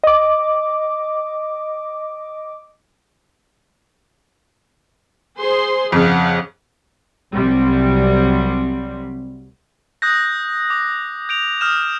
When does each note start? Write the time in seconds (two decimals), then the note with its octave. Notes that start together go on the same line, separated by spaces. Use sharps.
0.04 D#5 D6
5.38 G#4 C5 C6
5.92 F2 C#3 F5 F#5
7.34 C2 C3 F#3 G3
10.02 D#6 F#6 G6 A#6
10.70 D6
11.29 G6 D7 F7
11.61 D#6 F6 G6 E7